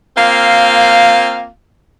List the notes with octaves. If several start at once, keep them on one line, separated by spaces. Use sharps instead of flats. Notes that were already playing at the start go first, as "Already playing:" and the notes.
A#3 C4 F4 F5